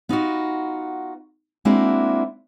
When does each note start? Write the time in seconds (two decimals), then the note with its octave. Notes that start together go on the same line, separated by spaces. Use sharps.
0.09 B3 D#4 F4 F#4
1.65 G#3 A#3 C4 D4 E4 F#4